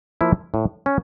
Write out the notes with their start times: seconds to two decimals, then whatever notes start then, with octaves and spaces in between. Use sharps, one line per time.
0.21 F3 A#3 E4
0.54 A2
0.86 C#4